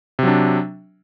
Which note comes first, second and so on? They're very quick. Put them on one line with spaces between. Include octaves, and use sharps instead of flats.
C3 F#3 D4